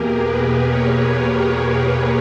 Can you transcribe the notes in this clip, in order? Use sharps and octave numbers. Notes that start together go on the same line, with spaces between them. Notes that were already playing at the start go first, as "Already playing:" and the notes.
Already playing: E2 B2 A#3 G4 G#4 A#4
B4
C#5